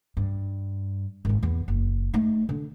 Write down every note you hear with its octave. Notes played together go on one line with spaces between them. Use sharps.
G2
G#1 F3
E2 B3
F#1
A3 D#4
D3